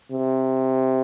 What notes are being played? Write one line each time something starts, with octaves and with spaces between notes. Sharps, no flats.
C3